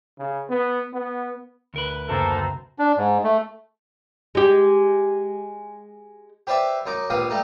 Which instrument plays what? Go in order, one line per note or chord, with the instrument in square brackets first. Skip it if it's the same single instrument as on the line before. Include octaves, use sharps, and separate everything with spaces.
[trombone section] C#3
B3
B3
[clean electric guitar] D2 A#4 B4
[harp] B1 F#2 C#3 [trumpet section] A#3 A4 [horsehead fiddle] C5 A#5
[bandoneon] D4
G#2
A3
[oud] G#3 G4
[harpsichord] G4 B4 C5 D5 E5
F#2 D#4 D6
A#1 G4 B4 F5 D#6
G3 A3 D#4